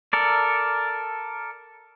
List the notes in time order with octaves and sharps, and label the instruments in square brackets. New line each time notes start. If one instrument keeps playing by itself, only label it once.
[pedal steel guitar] A4 A#4 D5